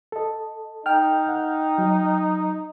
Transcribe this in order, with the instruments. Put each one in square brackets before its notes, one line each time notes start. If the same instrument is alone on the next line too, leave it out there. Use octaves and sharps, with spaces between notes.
[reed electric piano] A4 D#5
[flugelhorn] D#4 [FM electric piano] G5 F6
[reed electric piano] F#5
F#3